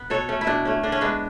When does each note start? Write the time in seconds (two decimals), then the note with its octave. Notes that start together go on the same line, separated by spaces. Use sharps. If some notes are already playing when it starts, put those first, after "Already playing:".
Already playing: B3
0.10 B2 A4 C#5
0.29 A3 C#4
0.41 E4
0.47 B2 D4
0.65 A3 C#4
0.83 D3 D4
0.92 C#4
1.01 G#3 B3 D4